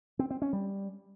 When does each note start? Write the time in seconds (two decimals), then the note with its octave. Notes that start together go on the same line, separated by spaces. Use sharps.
0.19 C4
0.30 C4
0.42 C#4
0.53 G3